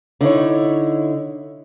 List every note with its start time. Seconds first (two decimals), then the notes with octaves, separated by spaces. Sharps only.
0.21 D3 D#4 E4 C#5